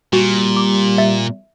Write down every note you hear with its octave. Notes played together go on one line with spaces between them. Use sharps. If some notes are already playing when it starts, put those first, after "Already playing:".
A#2 G3 F#4
D6
E5 A6